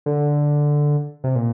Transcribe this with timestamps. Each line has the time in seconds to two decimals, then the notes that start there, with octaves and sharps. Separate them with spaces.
0.06 D3
1.24 C3
1.36 A#2